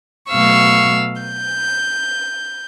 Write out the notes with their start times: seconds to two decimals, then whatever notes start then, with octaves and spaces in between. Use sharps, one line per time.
0.30 B2 F#3 A3 F5 C#6 E6
1.22 G6